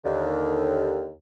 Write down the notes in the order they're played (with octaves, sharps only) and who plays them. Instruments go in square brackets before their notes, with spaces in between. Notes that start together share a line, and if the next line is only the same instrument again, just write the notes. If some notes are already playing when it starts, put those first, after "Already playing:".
[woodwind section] D#2 D3